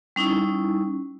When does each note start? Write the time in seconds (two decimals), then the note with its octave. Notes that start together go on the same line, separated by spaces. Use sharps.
0.16 G3 C#4 D#4 E4